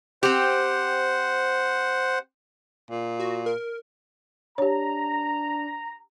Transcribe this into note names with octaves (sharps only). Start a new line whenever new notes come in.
C4 G4 C5 F#5
A#2
F#4
A#4
D4 G4 C#5 A#5